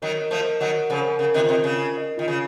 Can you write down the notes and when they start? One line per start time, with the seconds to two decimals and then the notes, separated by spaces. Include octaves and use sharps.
0.02 D#3 F#3 A#4
0.22 D#5
0.31 F3 A3
0.41 A#4
0.61 D#3 F#3 F#5
0.80 F#5
0.90 C#3 F3
1.00 A#4
1.19 C#3 A#4
1.34 C3 D#3
1.39 F4
1.49 C3 D#3
1.59 F4
1.64 C#3
1.79 A#4
1.97 D#5
2.18 D#3 F4
2.28 C#3